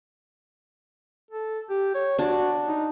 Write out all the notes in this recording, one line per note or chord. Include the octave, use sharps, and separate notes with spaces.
A4
G4
C#5
D4 F#4
D#4